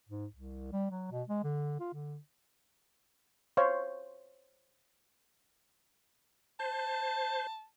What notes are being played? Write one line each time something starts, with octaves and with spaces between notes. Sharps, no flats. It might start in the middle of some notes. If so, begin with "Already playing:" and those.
G#2
C2
G3
F#3
B2
G#3
D3
F4
D3
C5 C#5 F5
C5 A5